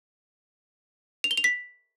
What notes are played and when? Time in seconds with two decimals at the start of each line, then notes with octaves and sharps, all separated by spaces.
1.24 F7
1.31 G7
1.37 F7
1.44 B6